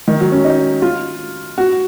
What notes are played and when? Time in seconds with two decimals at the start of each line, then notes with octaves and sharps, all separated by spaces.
0.08 D#3
0.20 F#3
0.32 C#4
0.45 D#4
0.82 F4
1.58 F#4